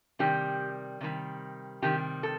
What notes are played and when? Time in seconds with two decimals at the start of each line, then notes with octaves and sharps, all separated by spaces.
0.19 C3 D#3 G3 G4
1.00 C3 D#3 G3
1.82 C3 D#3 G3 G4
2.23 A4